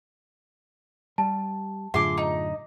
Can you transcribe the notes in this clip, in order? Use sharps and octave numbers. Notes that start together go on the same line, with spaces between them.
G3 A5
F#2 A2 D3 F4 G#4 E5 C6 D6
D#4